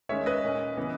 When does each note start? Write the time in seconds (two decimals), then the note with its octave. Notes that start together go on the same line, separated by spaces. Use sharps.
0.09 D#3 G#3 C#4 C#5 E5
0.26 B4 D#5
0.44 A#2 A#3 C#4
0.77 C#3 E3 B3